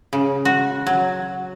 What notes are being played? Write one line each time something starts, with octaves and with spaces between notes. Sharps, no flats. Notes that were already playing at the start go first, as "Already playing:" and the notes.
C#3
F#4
F#3